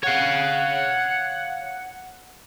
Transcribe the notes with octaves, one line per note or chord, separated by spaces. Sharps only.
C#5 F5 F#5